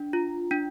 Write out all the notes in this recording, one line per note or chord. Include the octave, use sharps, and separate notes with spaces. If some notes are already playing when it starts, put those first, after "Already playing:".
Already playing: D4
F4
D4